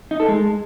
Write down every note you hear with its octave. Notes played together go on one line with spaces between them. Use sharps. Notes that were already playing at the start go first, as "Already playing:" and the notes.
D#4
A4
G#3